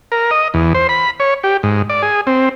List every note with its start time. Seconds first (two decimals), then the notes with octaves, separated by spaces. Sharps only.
0.12 A#4
0.31 D#5
0.54 E2
0.74 C5
0.89 B5
1.20 C#5
1.44 G4
1.63 G#2
1.90 D5
2.02 G#4
2.27 C4